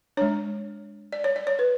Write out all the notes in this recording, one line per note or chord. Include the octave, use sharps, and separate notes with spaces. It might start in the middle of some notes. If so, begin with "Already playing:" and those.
G#3 D4 C#5
D5
C#5
D5
C#5
B4